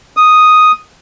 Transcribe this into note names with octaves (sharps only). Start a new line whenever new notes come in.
D#6